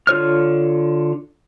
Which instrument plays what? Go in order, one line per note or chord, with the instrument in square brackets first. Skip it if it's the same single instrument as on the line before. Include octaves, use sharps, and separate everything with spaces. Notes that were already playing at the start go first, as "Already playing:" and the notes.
[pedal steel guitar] D3 F4 C#5 F6